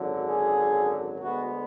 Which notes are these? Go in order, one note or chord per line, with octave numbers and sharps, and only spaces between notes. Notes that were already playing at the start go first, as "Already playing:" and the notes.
Already playing: G#1 F#2 D3 F#3
G#4
D2 D3 G#3 B3 F#4